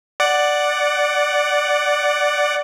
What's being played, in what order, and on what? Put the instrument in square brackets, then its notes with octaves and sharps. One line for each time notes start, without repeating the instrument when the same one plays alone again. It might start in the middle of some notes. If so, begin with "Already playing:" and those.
[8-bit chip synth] D5 F#5